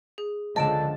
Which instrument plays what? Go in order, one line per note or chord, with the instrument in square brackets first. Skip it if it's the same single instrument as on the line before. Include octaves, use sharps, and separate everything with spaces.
[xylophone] G#4
[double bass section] C#2 D3 F3 [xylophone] D#5 D7 E7 [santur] A5